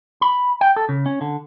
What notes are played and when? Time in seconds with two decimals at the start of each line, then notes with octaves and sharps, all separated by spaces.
0.21 B5
0.61 G5
0.76 A4
0.89 C#3
1.06 C#4
1.21 D3